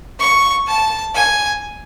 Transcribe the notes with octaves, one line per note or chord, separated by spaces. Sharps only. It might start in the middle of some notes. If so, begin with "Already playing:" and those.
C#6
A5
G#5